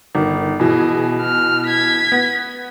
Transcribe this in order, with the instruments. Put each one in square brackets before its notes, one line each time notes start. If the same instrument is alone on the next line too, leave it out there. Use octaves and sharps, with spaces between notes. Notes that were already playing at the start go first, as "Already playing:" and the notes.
[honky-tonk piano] G1 D#3
[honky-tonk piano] B2 E3 [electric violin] G#4
[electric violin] F6
G#6 B6
[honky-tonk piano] B3